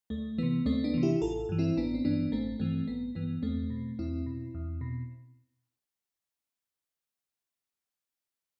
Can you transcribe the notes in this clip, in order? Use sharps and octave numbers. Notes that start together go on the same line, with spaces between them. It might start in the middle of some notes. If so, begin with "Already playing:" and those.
D2 A3
C3 E3 B3
D2 A3 C4
B3 D4
C3 E3
E4 G4
A1 F4 A4
G2 E3
C4 E4
A1 B3 D4
C4
G2 E3 B3 D4
A1 A3 C4
G2 E3 A3 C4
A1 B3
G2 E3 B3
E2 A3 C4
B2
E2 C4 E4
B2
E2
B2